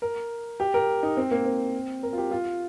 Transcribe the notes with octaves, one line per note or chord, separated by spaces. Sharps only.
A#4
G4
A#4
D#4
C4
A#3
C4
A#4
F4
G4
F4